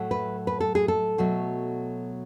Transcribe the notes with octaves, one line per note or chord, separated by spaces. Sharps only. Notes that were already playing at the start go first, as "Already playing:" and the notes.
Already playing: A2 F#3 A3
B4
B4
A4
G#4
A4
B2 F#3 A3